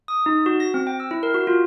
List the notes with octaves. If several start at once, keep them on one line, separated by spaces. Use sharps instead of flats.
D#6
D#4
F#4
A#6
C4
G5
E6
E4
A#4
F#4
F4